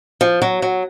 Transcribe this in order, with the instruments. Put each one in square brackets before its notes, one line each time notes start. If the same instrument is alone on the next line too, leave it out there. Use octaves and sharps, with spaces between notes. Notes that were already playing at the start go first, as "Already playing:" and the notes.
[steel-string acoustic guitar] F3
F#3
F#3